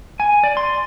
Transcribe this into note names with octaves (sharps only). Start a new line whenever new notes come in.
G#5
D5
C6